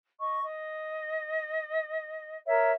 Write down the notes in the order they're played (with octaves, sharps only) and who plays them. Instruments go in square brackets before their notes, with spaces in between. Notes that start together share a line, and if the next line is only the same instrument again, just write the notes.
[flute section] D#5 C#6
D#5
A#4 C#5 E5